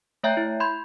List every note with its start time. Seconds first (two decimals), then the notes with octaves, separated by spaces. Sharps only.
0.23 A3 C#5 E5 G5 A#5 G6
0.37 E4
0.60 B5 C6 G6 G#6